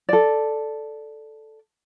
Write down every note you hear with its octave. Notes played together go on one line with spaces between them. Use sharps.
A4 D5